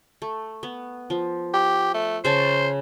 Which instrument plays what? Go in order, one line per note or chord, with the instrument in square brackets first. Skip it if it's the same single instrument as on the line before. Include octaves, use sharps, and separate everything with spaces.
[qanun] A3
B3
F3
[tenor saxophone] G4
A3
[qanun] C#3 C#5 A5 [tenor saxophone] C5